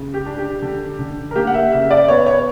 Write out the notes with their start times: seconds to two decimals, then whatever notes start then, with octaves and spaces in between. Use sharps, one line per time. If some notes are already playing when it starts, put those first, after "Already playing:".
Already playing: C#3
0.14 G4
0.26 D4
0.38 G4
0.62 D3
0.99 D3
1.31 A#4
1.35 A#3 G4
1.47 F#5
1.54 E5
1.72 C#3 E5
1.91 D5
2.08 B3 C#5
2.26 C#5